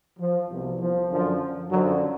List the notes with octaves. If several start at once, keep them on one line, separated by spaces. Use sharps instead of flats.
F3
C2 B2
F3
F#2 D3 F3
F#2 D3 F3 F#3